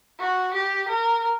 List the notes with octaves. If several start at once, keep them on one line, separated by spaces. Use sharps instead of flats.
F#4
G4
A#4